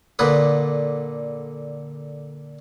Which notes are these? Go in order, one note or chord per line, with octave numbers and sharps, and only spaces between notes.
A#2 D3 B4 D#6